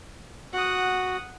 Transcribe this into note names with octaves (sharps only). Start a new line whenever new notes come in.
F#4 F#5 D#6